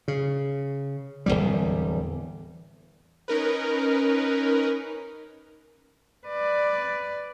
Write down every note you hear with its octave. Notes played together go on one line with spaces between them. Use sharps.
C#3
D1 G#1 E2 G3
C#4 D#4 A#4 B4
B4 D5